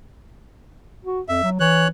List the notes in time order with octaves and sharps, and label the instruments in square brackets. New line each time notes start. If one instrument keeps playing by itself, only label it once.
[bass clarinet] F#4
[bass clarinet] F2 [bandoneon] E5
[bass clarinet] F#3
[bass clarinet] E3 [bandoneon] C#5 F#6